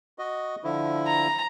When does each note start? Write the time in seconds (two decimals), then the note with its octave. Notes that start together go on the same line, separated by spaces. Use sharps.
0.19 F#4 D#5
0.64 D3 F3 E4
1.07 A#5